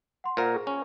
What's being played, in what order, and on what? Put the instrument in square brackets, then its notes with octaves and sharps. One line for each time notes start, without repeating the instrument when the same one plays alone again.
[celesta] F#5 C6
[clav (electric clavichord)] A#2 A#4 [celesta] C5 F#5
[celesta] G#4
[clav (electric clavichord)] C#4